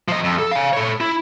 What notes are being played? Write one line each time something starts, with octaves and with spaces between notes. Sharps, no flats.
F3 D#5
F2
A4
F5 G#5
A4 C#5
E4